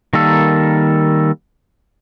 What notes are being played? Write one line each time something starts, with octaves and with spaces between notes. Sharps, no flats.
D#3 G3 A#3 A4